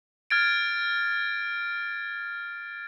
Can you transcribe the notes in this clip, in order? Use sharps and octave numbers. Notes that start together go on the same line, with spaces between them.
F6 G#6 A6 D7